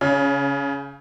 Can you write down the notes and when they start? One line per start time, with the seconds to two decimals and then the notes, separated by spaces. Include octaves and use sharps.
0.01 C#3